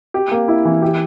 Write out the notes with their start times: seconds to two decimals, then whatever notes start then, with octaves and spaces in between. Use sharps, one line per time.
0.14 G4
0.32 A#3
0.48 E4
0.65 E3
0.82 G4